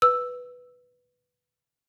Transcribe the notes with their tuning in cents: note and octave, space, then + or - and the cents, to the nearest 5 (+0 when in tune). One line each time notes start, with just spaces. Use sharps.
B4 +0 E6 +0